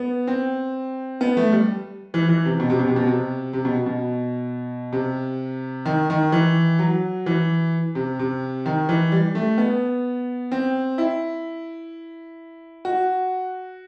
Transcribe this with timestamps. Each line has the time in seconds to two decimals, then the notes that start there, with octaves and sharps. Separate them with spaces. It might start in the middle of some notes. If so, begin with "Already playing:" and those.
Already playing: B3
0.27 C4
1.21 B3
1.37 A3
1.52 G3
2.14 E3
2.29 E3
2.45 C3
2.60 B2
2.70 C3
2.79 B2
2.88 C3
2.96 B2
3.07 C3
3.53 C3
3.65 B2
3.86 B2
4.93 C3
5.86 D#3
6.10 D#3
6.32 E3
6.79 F#3
7.26 E3
7.95 C3
8.19 C3
8.66 D#3
8.89 E3
9.12 G3
9.35 A3
9.58 B3
10.52 C4
10.98 E4
12.85 F#4